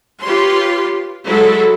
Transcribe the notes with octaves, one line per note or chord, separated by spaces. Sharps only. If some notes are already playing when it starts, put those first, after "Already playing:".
F4 G4 B4 C#5 C6
F#3 G#3 E4 A4